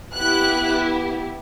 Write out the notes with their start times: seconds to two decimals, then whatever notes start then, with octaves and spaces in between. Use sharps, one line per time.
0.14 B3 E4 G4 F#6